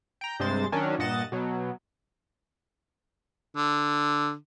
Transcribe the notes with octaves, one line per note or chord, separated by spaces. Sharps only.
G5 A#5
G2 C3 G#3 C5 A6
D#3 F#3 C#4 D4
G2 A#2 D#5 F#5 A6 E7
B2 F#3
D3